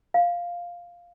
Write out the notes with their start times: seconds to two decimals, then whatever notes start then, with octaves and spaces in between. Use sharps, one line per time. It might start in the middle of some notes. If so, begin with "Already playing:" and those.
0.14 F5